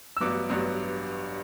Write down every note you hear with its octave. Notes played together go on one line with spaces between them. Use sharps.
E6
A1 G2 F#3 B3 D6
A1 G2 F#3 B3